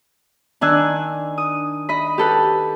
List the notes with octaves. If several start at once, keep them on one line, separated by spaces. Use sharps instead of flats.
D#3 D4 G#5 E6 F#6
D#6
D#5 B5
G4 A4 B4